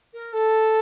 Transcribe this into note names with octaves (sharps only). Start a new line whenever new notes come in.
A#4
A4